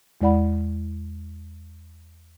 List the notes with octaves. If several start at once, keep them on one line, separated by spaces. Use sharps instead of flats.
E2 G#3 E4 D5 F#5 B5